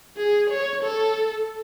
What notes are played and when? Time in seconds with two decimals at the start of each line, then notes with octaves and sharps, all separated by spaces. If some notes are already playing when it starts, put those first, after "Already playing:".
0.17 G#4
0.50 C#5
0.83 A4